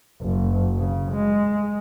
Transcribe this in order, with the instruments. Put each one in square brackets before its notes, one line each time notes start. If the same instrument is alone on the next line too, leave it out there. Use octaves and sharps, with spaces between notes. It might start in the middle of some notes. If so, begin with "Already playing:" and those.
[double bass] F#1
C#3
G#3